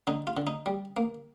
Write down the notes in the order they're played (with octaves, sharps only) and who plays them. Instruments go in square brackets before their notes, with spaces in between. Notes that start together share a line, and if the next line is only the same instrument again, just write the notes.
[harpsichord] D3 D#4
F4
D3
D#4
G3
A#3